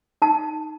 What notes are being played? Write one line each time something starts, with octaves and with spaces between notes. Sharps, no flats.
D#4 A5